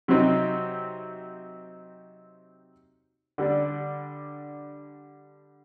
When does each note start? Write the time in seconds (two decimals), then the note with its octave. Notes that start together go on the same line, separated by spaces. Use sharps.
0.08 C3 F#3 C4 D#4
3.38 D3 G3 D4